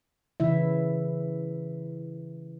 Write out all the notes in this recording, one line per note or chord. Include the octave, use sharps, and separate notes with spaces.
C#3 E3 E4 E5